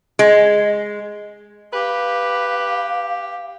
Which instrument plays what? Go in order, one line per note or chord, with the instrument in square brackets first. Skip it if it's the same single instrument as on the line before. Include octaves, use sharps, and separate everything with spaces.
[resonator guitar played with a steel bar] G#3
[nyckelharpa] G4 [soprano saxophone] B4 [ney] F5